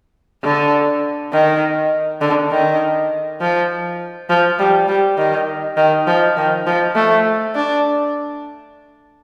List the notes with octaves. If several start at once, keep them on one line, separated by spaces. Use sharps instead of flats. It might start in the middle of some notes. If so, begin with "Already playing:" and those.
D3
D#3
D3
D#3
F3
F3
G3
G3
D#3
D#3
F3
D#3
F3
A3
D4